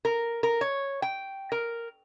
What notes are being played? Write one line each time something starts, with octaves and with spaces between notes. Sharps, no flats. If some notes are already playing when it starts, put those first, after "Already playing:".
A#4
A#4
C#5
G5
A#4